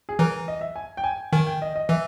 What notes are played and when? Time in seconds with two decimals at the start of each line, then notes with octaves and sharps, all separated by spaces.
0.09 G#4
0.19 E3 A#4
0.48 D#5
0.61 E5
0.76 G#5
0.97 G5
1.04 G#5
1.33 D#3 G#5
1.47 G5
1.62 D#5
1.76 D#5
1.89 E3 E5